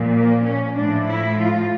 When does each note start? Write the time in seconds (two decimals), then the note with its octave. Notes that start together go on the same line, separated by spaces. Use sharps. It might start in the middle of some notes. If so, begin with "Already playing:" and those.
Already playing: A#2 F3
0.14 A#3
0.46 C#4
0.77 A2 F3 D4
1.08 E4
1.40 F4